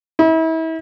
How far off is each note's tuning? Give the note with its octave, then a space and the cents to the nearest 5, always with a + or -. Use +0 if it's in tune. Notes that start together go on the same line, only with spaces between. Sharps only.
E4 -35